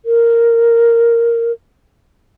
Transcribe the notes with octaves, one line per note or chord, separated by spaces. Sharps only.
A#4